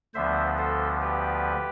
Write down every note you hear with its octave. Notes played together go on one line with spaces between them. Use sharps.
D2 D3 F3 B3 C5 E5
A4 C5
G4 B4